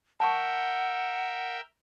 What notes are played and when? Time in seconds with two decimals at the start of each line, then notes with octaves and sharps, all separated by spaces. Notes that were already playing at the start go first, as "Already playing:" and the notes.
0.20 A#4 E5 F#5 G5 A5 C#6